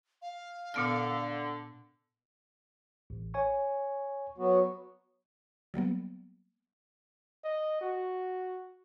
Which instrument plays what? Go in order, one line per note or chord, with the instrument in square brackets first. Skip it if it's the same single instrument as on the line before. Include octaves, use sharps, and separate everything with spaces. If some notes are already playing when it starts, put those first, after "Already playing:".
[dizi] F5
[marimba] A#2 B3 F6 [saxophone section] D3
[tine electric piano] A1
C#5 G#5 C#6
[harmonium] F#3 B3 F#4
[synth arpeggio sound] F#3 G3 A#3 B3
[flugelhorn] D#5
F#4